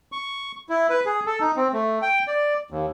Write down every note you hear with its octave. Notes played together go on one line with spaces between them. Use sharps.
C#6
E4
B4
G#4
A4
D#4
C4
A3
G5
D5
D#2